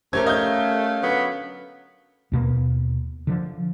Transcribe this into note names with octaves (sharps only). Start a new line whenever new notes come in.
A3 C#4 G4 A#4 C5 G#6
D#5 F5 G6
D3 F#3 B3
D#2 B2 A#3
D3 F3